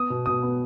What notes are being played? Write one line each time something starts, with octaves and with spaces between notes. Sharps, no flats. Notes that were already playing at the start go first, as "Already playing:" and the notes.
Already playing: B3 D#6
B2
B2 D#6
B3